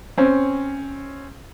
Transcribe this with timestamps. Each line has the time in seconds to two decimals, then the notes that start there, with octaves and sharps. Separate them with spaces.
0.18 C4 C#4